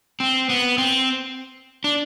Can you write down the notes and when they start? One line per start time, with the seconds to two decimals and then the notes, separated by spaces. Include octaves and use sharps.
0.20 C4
0.50 B3
0.78 C4
1.84 D4